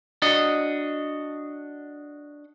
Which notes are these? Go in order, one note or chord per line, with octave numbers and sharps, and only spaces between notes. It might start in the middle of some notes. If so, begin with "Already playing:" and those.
D4 F#4 D#5